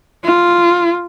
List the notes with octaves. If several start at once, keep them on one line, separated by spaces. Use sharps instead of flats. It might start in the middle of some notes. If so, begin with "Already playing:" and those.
F4